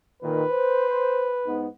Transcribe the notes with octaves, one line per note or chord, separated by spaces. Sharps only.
A#2 D#3 B4
C5
G#2 B3 D#4